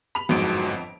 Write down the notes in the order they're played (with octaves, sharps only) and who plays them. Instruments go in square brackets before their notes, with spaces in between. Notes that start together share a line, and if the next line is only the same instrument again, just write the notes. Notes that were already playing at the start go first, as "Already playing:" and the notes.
[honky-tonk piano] B5 F7
[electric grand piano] G1 G#2 D7 [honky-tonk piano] F2 [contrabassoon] F#3